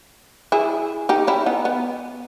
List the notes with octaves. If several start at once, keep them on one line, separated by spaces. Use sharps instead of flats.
E4 G#4
D#4 G4
C#4 E4
B3 D#4
B3